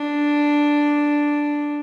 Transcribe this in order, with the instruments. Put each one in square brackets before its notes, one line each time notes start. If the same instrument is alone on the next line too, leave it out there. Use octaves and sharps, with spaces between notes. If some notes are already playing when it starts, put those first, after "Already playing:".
Already playing: [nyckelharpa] D4